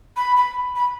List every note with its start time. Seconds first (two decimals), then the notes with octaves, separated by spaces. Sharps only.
0.16 B5
0.36 B5
0.76 B5